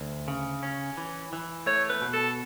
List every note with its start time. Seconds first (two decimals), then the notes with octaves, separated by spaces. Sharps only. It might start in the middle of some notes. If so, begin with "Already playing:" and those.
Already playing: D2
0.28 C#3
0.63 C#4
0.98 E3
1.33 E3
1.66 A3 C#5
1.89 B4
2.02 B2
2.13 A4